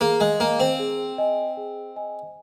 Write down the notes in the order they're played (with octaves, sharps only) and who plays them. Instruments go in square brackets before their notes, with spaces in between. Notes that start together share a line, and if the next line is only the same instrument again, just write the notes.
[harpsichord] A#3 [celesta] G#4
[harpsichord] G#3
[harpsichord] A#3 [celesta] D#5 G#5
[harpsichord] C4
[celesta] G#4
D#5 G#5
G#4
D#5 G#5